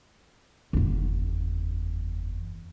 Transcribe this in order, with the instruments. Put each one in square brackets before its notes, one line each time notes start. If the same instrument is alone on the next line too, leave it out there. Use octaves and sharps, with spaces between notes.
[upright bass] F#1 E2